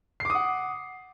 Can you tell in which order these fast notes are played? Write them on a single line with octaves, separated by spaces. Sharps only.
C7 D6 D#6 F#5